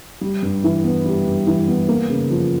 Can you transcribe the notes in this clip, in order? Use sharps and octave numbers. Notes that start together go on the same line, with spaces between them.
G3
G2
E3
B3
G3
G2
E3
B3
A#3
C#3
F3